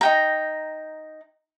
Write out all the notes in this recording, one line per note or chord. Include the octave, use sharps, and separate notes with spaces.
D#4 G5 A#5